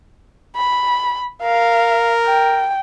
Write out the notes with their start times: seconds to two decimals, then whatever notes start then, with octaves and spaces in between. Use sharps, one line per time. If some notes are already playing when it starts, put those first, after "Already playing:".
0.56 B5
1.42 A#4 F5
2.27 G5